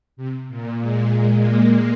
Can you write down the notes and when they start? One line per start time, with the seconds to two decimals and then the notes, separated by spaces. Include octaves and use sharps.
0.17 C3
0.49 A#2
0.81 G#3
1.43 A#3